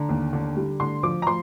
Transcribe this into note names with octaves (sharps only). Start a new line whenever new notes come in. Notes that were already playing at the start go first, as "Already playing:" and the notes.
Already playing: D3 A#5
D#2
D3
G3
D3 C6
F3 D6
A#5
F3 C6